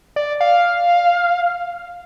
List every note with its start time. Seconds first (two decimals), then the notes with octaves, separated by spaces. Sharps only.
0.16 D5
0.41 F5